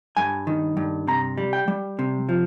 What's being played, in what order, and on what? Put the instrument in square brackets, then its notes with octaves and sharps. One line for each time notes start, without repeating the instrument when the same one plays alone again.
[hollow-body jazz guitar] G2 G#5
D#3
G2
C3 A#5
G3
G5
G3
C3
F3